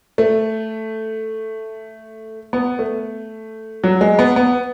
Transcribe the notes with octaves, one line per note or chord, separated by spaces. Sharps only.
A3
B3
A3
F#3
G#3
B3
B3